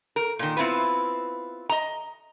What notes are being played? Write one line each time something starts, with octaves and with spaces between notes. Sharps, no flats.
A#4
A#2 D#3
B3 C4 E4 F4 B4
D#5 A#5